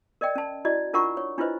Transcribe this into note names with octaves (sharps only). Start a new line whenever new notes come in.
A#4 D5 D#5 G5
C#4 A5
E4 F#4 D5 D#5
D4 F4 A#4 F#5 A#5 C#6
C#5
D4 E4 F4 B4 C5 D#5